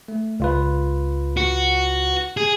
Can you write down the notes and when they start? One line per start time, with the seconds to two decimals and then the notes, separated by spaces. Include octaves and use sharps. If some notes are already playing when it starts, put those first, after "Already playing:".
0.08 A3
0.40 C#2 F4 B4
1.37 F#4
2.37 G#4